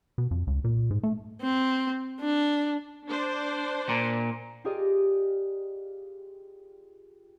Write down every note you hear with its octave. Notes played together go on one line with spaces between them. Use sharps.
B2
F2
C#2
A#2
G#2
A3
C4
D4
D4 C5
A#2
F4 G4 G#4 A#4 D5 D#5